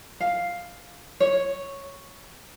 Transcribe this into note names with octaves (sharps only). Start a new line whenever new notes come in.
F5
C#5